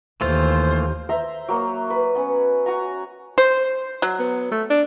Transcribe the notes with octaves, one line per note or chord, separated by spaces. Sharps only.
D#2 E3 A3 F4 C5
C5 E5 A#5
F#3 A#3
B4
B3 C#4
F#4 G#5 A#5
C5
F#3
B3
A3
D4